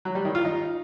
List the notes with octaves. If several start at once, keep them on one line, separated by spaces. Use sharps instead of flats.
F#3
G3
D#3
F4
D#4